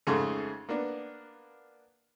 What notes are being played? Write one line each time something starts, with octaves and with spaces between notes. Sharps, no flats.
F2 G#2 C#3 G#3 A3
A#3 B3 D4